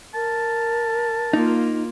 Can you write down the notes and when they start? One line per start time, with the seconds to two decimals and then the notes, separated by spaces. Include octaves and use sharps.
0.14 A#4 A5
1.33 A#3 D#4 F4